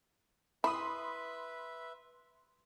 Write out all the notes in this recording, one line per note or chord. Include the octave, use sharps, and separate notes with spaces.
E4 B4 E5 B5 C6 D#6